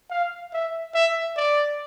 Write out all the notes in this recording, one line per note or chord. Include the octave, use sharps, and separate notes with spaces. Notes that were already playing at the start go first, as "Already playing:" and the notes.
F5
E5
E5
D5